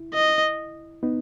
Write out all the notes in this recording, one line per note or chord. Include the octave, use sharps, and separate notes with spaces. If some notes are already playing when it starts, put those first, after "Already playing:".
Already playing: E4
D#5
B3 D#4